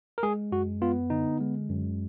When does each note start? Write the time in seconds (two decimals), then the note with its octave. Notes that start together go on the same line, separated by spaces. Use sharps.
0.18 A#4
0.23 G#3 G#4
0.52 F#2 F#4
0.82 B3 F4
1.10 D3 D#4
1.40 G#3
1.69 F#2